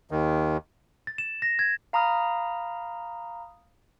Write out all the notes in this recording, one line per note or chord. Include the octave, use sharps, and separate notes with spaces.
D#2 D#3
A6
E7
A#6
G#6
F5 A#5 B5 D#6 F6